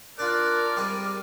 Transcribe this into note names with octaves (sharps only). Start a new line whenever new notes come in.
D4 F4 A#4 D5 F#6
G3 G#3 C4 D6